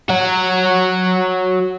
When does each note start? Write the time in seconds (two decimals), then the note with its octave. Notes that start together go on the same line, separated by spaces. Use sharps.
0.09 F#4 C#5